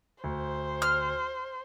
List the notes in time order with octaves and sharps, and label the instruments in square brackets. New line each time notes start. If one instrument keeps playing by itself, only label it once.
[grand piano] D2 [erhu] C5
[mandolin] F6